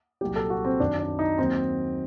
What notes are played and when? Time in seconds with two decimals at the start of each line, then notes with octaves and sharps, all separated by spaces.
0.21 C2 A#2 F#3 G4
0.36 A4
0.50 F#4
0.65 C4
0.80 F#2 D#3 F#3 D4
0.99 D4
1.19 D#4
1.38 D#2 D#3 F#3 C4